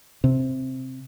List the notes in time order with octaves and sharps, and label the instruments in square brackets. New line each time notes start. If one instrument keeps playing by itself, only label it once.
[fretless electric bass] C3